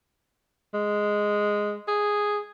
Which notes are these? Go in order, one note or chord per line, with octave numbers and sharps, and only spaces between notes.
G#3
G#4